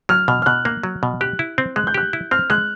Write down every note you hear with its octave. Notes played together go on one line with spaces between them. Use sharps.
F#3 F6
B2 F6
F6
B2 F#6
A#3 F#6
F#3
B2
G4 F#6
E4
C4
G#3 F#6
G6
G4 F#6
E4
C4 F6
G#3 F#6